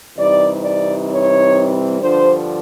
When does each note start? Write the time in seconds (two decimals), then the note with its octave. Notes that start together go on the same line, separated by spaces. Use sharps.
0.17 C3 E3 G3 C4 D#4 D5
0.63 D5
1.10 C#5
2.01 G2 D3 F3 C5